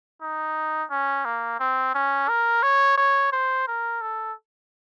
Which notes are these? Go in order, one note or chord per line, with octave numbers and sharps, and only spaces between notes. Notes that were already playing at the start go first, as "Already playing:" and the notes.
D#4
C#4
A#3
C4
C#4
A#4
C#5
C#5
C5
A#4
A4